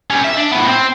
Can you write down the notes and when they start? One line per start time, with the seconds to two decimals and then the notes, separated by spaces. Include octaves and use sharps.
0.11 G3 C#4
0.25 E5
0.37 D4
0.52 A2 B3
0.67 C4